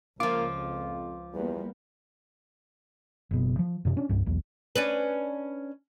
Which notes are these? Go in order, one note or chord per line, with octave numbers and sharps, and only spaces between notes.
C#2 F3 A#3 F4 D6
F2
E2 G3 A#3 B3
F#1 B2
F3
F#2 C3
C#4 D4
C2 G2
B1 E2
C#4 D4 B4